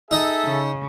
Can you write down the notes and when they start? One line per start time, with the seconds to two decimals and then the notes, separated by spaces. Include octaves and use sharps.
0.11 D#4 G#4 A4 D#5 E5
0.45 C#3